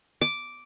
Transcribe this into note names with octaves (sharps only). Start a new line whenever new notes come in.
D6